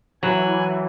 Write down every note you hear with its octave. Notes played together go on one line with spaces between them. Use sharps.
E3 F#3 G#5 F#6